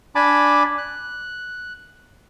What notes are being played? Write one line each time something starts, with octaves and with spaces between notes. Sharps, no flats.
D4 G#5 A5 B5 D6
F#6